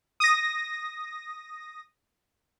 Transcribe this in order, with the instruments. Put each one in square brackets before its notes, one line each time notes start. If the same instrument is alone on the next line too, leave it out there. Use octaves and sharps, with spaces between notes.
[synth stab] D#6 A#6